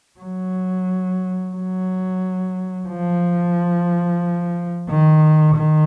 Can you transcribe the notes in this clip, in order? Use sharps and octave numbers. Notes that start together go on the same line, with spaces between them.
F#3
F#3
F3
D#3
D#3